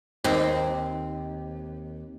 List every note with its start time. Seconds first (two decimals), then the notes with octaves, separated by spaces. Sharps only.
0.24 D#2 C4